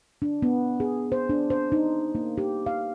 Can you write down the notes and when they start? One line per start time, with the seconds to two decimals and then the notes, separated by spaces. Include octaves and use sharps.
0.22 D4
0.42 B3
0.80 G#4
1.12 C5
1.30 D4
1.50 C5
1.72 D#4
2.15 A#3
2.38 G4
2.66 F5